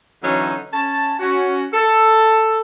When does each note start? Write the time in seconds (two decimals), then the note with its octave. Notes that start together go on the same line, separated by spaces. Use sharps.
0.23 D3 E3 F#3 C#4 D#4
0.73 C#4 A5
1.20 C#4 F#4
1.74 A4